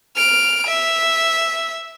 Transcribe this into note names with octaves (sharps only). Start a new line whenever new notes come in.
F6 D7
E5